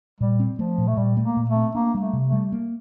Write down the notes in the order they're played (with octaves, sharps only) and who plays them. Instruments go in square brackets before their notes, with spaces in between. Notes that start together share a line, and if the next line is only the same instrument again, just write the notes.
[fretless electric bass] A#2 [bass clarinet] G3
[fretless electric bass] C4
[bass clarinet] F3 [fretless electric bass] A3
[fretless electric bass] A#2
[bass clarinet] A3
[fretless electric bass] A#2 [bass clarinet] G3
[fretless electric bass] A3
[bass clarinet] A#3
[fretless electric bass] A#2
[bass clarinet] A3
[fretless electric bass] C4
[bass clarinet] A#3 [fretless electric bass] D4
[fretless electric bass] G3
[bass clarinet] A3
[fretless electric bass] C3
[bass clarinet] A3
[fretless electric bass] G3
A#3